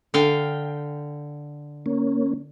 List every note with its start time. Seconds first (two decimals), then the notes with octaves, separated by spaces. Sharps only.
0.14 D3 F5 G5
1.86 A#3 C#4